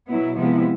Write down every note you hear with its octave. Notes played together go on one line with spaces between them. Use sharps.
B2 F#3 B3 E4
C3 F3 G#3 B3 E4